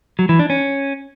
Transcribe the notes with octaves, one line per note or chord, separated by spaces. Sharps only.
F#3
E3
D4
C#4